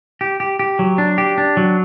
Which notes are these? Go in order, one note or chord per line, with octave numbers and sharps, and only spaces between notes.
G4
G4
G4
F#3
D4
G4
D4
F#3